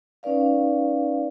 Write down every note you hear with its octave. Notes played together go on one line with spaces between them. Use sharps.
C#4 D#4 B4 D5 F5